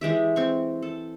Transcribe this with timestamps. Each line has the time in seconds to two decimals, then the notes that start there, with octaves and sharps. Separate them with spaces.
0.01 E3 G#3 G4 E5
0.36 C4 C#6
0.82 A4